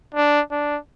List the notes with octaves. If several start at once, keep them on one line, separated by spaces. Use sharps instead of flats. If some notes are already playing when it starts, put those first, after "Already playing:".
D4
D4